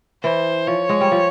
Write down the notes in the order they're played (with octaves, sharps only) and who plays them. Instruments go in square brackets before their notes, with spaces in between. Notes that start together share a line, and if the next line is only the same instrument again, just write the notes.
[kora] E3 [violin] C5
[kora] F3 [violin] C#5
[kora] G#3
G3
F3